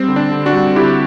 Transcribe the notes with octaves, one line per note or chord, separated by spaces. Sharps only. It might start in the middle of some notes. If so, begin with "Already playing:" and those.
Already playing: G3 C4
D3
D4
D3
D4 F#4
G3
D3 E4 G4